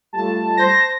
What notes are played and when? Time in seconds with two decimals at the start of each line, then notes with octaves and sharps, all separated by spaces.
0.13 G3 A3 F4 A5
0.57 C5 A#6